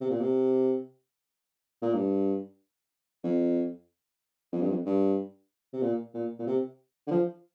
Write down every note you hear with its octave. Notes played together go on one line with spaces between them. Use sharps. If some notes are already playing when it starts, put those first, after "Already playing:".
C3
A#2
C3
A#2
G2
F2
F2
G2
F2
G2
C3
A#2
A#2
A#2
C3
D3
F3